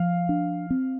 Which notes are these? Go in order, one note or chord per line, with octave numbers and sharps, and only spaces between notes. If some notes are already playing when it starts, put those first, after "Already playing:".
Already playing: F3 F5
D4
C4